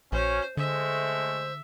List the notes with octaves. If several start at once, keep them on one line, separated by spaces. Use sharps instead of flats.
A#1 C#4 F#4 C5
D3 G#3 A3 C5 E5